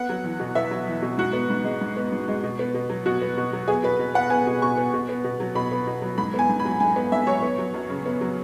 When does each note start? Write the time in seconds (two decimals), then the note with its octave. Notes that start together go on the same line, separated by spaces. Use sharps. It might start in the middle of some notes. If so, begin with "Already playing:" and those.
Already playing: B3 F#5
0.09 F#3
0.24 E2
0.40 B2
0.55 B3 E5
0.71 F#3
0.87 E2
1.02 B2
1.18 G#2 F#4
1.33 B3
1.50 G#2
1.64 G#3
1.81 G#2
1.97 B3
2.12 G#2
2.28 G#3
2.43 B2
2.59 B3
2.74 B2
2.90 F#3
3.06 B2 F#4
3.22 B3
3.37 B2
3.53 F#3
3.68 B3 G#4
3.83 B2 B4
3.99 B2
4.14 B3 F#5
4.30 B3 G#5
4.47 B2
4.62 B2 C#6
4.78 B3
4.94 B2
5.09 B3
5.24 B2
5.40 F#3
5.55 B2 B5
5.72 B3
5.87 B2
6.02 F#3
6.18 G#2 B5
6.34 B3 G#5
6.49 G#2
6.60 B5
6.65 F#3
6.80 G#2 G#5
6.96 B3
7.12 G#2 E5
7.27 F#3 C#5
7.42 B3
7.59 F#3
7.74 F#2
7.90 C#3
8.06 B3
8.21 F#3